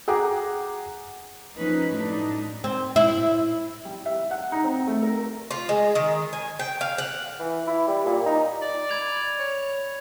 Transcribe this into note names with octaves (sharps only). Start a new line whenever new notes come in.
G#4 F#5 G5 A#5 D6
F3 A#3 C#4 D#4 B4
A2 F#3 D4 D#4
C4
E4
G3
E5
F#5
D#4
C4
A3
A#4
F4
G#3
D#3
G#5
G5
F5
F#5
E3
E4
G3
A#2
D#4
D5
B5 G#6 F7
C#5